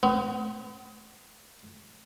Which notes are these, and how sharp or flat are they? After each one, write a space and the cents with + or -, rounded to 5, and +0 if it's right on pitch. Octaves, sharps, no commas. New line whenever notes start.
B3 +40